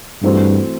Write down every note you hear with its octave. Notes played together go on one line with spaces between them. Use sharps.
G2 E3 A3 C4 F#4